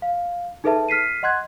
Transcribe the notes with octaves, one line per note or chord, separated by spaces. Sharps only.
F5
D#4 G#4 A4 B4 E5 A5
F6 B6 C7 D#7
D#5 F#5 C6 F#6 G#6